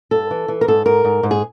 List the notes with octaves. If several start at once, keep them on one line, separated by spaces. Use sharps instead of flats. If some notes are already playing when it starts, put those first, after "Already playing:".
G2 A4
E3
E3
A#4
G#2 A4
G#2 A#4
G#2
G#2
G#4